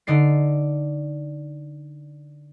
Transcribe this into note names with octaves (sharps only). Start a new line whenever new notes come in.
D3 D#4 D5 C7